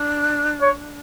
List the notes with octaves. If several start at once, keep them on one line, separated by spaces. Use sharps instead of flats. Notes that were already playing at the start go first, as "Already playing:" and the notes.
Already playing: D4
C#5